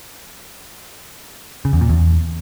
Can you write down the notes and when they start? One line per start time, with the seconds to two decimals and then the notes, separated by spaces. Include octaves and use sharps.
1.65 C#3
1.73 E2
1.81 A#2
1.89 E2